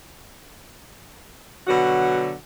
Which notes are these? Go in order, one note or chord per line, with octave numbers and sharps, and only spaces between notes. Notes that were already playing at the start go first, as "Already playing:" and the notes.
B2 D3 F#3 F#4